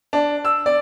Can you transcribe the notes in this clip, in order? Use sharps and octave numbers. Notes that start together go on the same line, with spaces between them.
D4
E6
D5